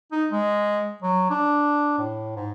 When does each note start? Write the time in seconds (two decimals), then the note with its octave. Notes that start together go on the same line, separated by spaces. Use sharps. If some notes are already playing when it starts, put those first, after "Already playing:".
0.12 D#4
0.31 G#3
1.03 F#3
1.30 D4
1.98 A2
2.36 G#2